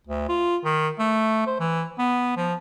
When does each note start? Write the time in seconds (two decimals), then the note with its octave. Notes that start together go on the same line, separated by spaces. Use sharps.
0.07 D2
0.29 F4
0.64 D#3
0.99 A3
1.47 C5
1.60 E3
1.98 B3
2.37 F3